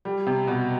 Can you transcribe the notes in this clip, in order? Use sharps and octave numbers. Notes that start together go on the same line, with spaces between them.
G3
C3
B2